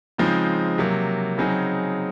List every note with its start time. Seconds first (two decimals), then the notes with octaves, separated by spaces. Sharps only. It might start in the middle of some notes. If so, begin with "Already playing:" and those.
0.18 C#3 F3 G#3 C4 D#4
0.78 C3 F#3 A#3
1.38 C#3 F#3 C4 D#4 G#4